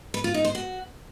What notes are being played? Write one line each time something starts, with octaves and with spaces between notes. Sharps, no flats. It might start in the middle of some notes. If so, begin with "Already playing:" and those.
B4
F4
D#4
C5
F#4